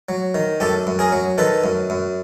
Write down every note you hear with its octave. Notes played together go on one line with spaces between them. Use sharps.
F#3
D#3
F#2 G4 A4
F#2
G#4 A#4
F#3
D#3 A4 B4
F#2
F#2